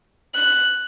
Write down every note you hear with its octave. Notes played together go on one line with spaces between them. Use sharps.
F#6